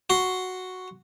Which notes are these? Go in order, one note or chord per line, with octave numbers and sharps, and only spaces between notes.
F#4 C6